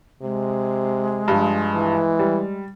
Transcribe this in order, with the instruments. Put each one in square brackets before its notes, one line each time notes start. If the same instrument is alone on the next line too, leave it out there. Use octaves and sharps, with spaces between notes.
[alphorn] C3 [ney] G#3
[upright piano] G2 F3
[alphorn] E3
[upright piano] G3